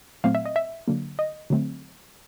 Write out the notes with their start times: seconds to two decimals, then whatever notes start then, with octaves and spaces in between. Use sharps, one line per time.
0.24 A#2 F#3 A3 C4 F5
0.35 E5
0.46 D#5
0.56 E5
0.88 D3 F#3 A#3
1.19 D#5
1.50 D3 F#3 A3 C4